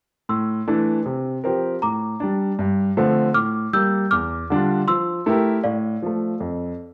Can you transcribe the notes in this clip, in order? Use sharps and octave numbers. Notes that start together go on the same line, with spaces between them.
A2 C6 E6
E3 A3 D4
C3
F3 C4 G4 A#4
A2 A#5 D6
G3 D4
G2
D3 F3 A3 C4
A2 D6 F6
G3 A#3 E6 G6
E2 D6 F6
D3 G3 D4 F4
F3 C6 E6
A3 E4 G4 A#4
A2 D5 F5
F3 A3
F2